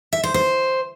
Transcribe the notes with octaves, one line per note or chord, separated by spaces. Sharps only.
E5
C5
C5